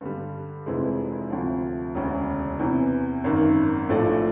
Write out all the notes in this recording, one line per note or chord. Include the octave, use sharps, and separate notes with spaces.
G2 D3 G3
F1 F2 C3 E3 G#3
D2 C3 F3
E1 D2 C#3
E2 C3 E3
G#1 F#2 D#3
A#1 A2 F3 A3 D4